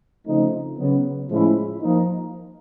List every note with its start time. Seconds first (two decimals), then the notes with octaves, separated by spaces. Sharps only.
0.27 C#3 F3 A3 C4 D#4
0.78 C#3 F#3 B3
1.29 A2 F3 G#3 C#4 E4
1.81 F3 A#3 D#4